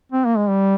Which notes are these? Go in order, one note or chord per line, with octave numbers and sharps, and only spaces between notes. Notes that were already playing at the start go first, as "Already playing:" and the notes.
C4
A#3
G#3
G3